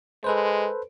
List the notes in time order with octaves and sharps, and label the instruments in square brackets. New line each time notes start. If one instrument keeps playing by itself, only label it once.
[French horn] G#3 [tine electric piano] A4 B4 C5